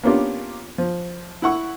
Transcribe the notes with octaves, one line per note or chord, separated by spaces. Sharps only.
A#3 B3 C#4 D4 F4 G4
F3
E4 F#5 C#6